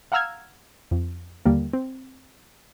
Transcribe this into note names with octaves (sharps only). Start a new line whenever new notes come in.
F5 F#5 A#5 E6 F6 G#6
F2
D#2 D3 G3 A#3
C4